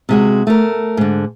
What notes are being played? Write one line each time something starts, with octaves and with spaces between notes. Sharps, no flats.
C3 G#3 F#4
A3 A#4
G#2 D3